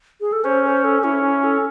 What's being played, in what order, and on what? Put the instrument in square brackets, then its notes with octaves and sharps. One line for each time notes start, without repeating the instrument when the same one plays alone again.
[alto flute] G#4
A4
[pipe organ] C#4 [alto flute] C5
[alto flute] C5
A4
[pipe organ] C#4 [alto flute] E4
[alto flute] E4
A4